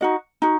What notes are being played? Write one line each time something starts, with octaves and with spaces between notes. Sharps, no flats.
D#4 F#4 D#5
D#4 F#4